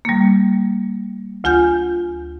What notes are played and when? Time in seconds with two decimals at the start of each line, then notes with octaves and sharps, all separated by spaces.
0.05 G3 A#3
1.44 D2 F4 G#5 G6